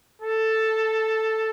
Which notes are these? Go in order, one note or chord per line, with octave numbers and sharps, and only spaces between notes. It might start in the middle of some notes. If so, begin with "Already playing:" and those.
A4